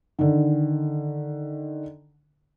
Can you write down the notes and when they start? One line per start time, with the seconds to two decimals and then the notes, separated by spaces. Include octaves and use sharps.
0.19 D3 D#3